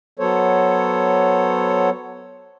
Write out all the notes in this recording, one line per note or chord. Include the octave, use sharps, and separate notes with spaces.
F#3 B3 A4 C5 C#5